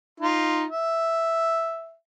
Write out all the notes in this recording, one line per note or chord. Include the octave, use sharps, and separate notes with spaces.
D#4 F4
E5